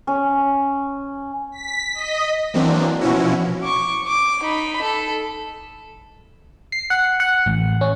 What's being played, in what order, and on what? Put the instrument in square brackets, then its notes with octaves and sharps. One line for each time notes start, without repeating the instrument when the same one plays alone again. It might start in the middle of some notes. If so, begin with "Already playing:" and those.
[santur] C#4
[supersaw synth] B6
D#5
E3 F#3 A#3 C4 D4
B2 F3 C#4 E4 F#4
[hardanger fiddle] C#6 D6
D6
D#4 B5
A4
[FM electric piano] C7
F#5
F#5
A1
C#4